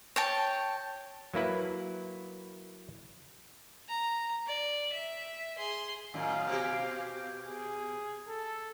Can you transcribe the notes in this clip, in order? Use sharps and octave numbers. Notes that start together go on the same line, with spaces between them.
C#5 G5 A5
F#3 A#3 E4 B4
A#5
D5
E5
G#4 C6
F#2 A2 D#3 F5
B2 F#4 G4
G#4
A4